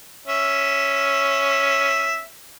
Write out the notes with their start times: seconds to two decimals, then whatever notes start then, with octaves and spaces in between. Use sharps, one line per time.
0.27 C#4 E5